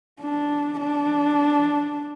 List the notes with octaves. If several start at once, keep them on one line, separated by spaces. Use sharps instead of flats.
D4
D4